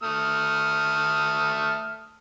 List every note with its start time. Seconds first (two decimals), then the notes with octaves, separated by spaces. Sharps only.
0.03 A3 D#6 F6